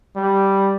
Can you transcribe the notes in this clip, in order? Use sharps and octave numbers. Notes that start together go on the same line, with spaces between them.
G3